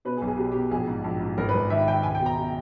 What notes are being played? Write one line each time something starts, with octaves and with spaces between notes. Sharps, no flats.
B2 B4
G#4
B1
G#4
B2 G4
B2 G4
A#1 G#4
G#2
A#1
G#2
G#1 A#4
B4
G#1
D#3 E5
D#3 G5
C#2 G#5
G5
B2
A#5
B2